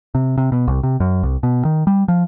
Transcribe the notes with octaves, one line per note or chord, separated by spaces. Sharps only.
C3
C3
B2
C2
C3
F#2
C2
B2
D#3
G3
F3